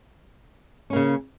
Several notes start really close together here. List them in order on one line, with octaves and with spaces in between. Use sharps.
C#4 A#3 C#3